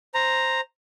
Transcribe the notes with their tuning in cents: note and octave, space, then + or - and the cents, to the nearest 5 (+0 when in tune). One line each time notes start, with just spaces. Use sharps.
C5 +0 A#5 +0